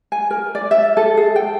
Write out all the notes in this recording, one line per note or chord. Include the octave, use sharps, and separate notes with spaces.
G#5
A#4
D5
E5
A4
G#4
G5